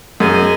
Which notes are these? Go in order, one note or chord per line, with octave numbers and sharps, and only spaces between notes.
F#2 G#4 D#5 G#5